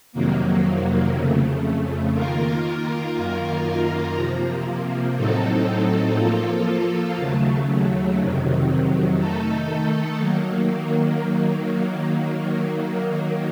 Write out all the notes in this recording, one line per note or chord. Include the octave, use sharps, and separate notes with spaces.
F2 C3 D#3 F#3 A#3
F2 C#3 A3
D#3 A#3 F4 A#4
F#2 D#3 A#3 F4 A#4
C3 F3 A#3
A2 F#3 C4 D#4 A4
F3 A#3 F4 A4
D#2 C#3 F#3 A3
F2 C3 D#3 F#3
D#3 A3 D#4 A4
D#3 F#3 A#3